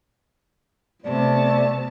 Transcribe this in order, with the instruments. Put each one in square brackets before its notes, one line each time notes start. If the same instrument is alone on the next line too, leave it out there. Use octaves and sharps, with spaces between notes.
[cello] C3 [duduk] A3 [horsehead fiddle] B3 A5 [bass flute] D5